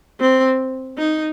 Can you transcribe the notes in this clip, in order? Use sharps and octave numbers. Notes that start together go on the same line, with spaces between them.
C4
D#4